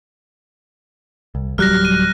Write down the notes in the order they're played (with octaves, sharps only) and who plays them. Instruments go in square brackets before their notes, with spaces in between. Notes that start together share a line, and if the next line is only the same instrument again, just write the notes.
[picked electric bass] C2
[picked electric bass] D1 F#3 G3 [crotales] F6 F#6 A#6
[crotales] D#7